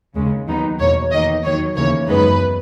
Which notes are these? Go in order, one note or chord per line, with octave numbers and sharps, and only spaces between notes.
D#2 C#3 G#3
D#2 D#3 F#3 B3 D#4
E2 B2 A#3 C#5
E2 D#3 A#3 D#4 D#5
D#2 D#3 F#3 C#5
D#2 C#3 E3 A#3 C#5
F#2 E3 G#3 B3 D#4 B4